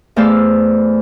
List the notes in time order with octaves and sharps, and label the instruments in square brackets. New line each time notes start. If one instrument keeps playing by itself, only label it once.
[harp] E2 A3 C5 D5 F5 E6